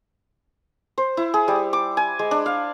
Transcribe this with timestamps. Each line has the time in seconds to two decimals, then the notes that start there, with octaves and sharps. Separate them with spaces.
0.98 C5
1.17 E4
1.34 G#4
1.48 G3
1.73 D6
1.97 G#5
2.19 G#3
2.31 D4
2.46 F5